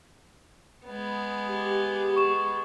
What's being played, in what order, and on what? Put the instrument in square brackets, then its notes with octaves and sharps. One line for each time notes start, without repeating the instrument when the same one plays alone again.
[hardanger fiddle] G#3 B3
[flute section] G4
[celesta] C#6 E7